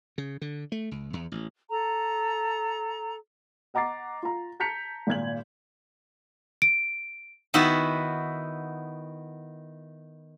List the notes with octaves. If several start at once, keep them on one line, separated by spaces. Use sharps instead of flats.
C#3
D3
A3
C#2
E2
A1
A4 A#5
D#5 F#5 A#5 D6 A6 C7
F4 A#5
A5 A#5 G6 B6 C#7 F7
G#1 A#2 G#6 F#7
D7
D#3 B3 E4 F#4